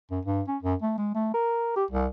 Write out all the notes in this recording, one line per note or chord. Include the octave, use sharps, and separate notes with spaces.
F#2
G2
C#4
F#2
A3
G#3
A3
A#4
G4
C2